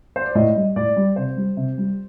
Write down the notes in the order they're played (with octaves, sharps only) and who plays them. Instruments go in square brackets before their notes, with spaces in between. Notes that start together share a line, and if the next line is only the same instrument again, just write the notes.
[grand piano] C5
D5
A2 D#5
G3
A2 D5
G3
C3 C5
G3
C3
G3